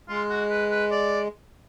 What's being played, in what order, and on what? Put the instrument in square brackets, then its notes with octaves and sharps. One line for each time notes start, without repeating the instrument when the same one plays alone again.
[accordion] G#3 [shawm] F4
[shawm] F#4
B4
B4
D5